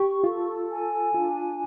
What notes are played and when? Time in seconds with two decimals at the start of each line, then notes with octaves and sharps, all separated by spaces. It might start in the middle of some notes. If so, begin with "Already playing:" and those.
Already playing: G4 C#6
0.24 F4 A4
0.69 G#5
1.14 D4 F4